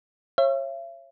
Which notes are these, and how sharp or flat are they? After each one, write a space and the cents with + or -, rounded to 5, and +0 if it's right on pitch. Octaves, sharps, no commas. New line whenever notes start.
C#5 -30 E5 +40